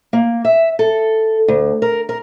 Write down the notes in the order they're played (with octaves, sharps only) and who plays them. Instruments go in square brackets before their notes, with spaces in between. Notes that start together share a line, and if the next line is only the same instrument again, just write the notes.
[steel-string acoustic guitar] A#3
E5
A4
D2
A#4
A#4